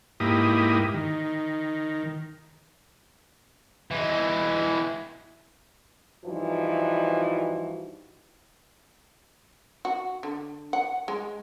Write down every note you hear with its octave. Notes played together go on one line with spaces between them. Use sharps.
G#2 A#3 E4 G4 D#6
D#3
E3 G#3
G2 E3 F3 D#4 F#4
F#4
D3
F#5
G#3